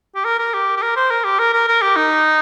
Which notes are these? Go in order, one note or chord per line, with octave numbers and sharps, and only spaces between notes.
G4
A#4
A#4
G4
G4
A#4
C5
A#4
G4
A#4
A#4
A#4
G4
D#4